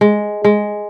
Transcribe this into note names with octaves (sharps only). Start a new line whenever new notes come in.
G#3
G#3